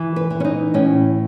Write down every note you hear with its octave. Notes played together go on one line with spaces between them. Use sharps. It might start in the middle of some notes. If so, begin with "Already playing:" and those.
Already playing: E3
B4
E3
C#4
D#4
A2 C#4